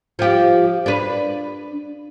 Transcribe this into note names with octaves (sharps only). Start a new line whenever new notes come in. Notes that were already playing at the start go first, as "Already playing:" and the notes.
F3 G4
D4 B4